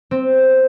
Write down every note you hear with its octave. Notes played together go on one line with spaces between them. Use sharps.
C4